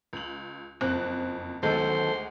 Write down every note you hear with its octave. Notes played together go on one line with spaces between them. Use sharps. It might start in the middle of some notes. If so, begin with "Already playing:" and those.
C#2 F#7
F#1 F2 C4 F#6
D2 D#3 F#3 G#3 B3 A4 C5 G6